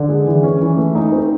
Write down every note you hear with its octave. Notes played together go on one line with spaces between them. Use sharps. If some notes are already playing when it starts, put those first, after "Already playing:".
Already playing: D3
G#3
E3
C#4
E3
A3
D#4
C4